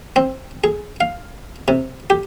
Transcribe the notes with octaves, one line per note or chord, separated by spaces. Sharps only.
C4
G#4
F5
C3
G4